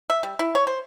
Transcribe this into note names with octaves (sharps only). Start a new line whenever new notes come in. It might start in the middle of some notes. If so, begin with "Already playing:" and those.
E5
G3
E4
C#5
C5